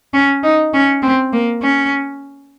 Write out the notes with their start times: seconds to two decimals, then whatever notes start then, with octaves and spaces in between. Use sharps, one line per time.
0.14 C#4
0.43 D#4
0.74 C#4
1.02 C4
1.33 A#3
1.62 C#4